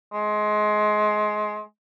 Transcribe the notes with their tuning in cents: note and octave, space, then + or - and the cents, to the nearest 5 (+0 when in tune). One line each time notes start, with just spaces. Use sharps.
G#3 +25